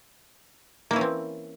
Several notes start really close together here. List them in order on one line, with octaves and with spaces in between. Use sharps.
A#3 E4 C#4 E3 C4